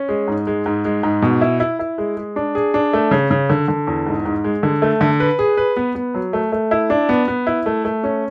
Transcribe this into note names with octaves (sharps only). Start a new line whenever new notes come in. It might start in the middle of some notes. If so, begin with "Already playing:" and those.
Already playing: C#4
G#3
G#2
G#3
G#2
G#3
G#2
B2
E4
E4
E4
G#3
G#3
D4
G#4
D4
A3
C#3
C#3
D3
D3
E2
G#2
G#2
G#3
D3
A3
D3
B4
G#4
B4
B3
B3
F#3
A3
A3
E4
D4
B3
B3
E4
A3
A3
C#4